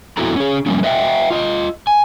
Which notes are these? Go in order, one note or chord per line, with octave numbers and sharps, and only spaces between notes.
F2 B3 E4 F#4 A4 A#5
C#4 G#4
F3 G3 A#3 C#4
B4 D#5 E5 F#5 G5
F4 D#5
G#5